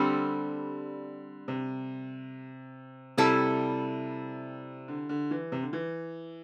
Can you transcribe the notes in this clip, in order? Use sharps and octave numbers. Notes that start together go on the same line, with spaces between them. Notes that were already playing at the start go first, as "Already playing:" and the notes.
Already playing: D3 G3 C4 A4
C3
C3 G3 E4 A4
D3
D3
E3
C3
D3
E3